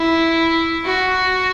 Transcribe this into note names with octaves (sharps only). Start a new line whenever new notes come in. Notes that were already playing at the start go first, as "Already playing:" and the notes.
Already playing: E4
F#4